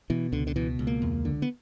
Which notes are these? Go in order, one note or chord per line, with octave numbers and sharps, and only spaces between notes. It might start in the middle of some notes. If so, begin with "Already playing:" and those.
B2 E3
C#2 D3
D3
B2 E3
C#2
A#3
E2
D3
B3